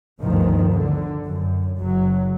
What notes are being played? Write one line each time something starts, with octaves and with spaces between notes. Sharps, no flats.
G1 D2 D#3 F3
D3
F#2
F#1 F#3